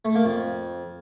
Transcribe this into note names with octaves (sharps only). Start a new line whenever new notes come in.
A3
A#3
F2